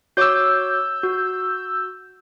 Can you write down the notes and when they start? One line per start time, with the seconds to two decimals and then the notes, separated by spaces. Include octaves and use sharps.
0.17 F#4 C#5 D6 E6 G6
1.03 F#4